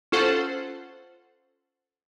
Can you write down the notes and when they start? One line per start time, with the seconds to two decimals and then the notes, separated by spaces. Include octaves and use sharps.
0.12 C#4 F4 A4 C5 F#5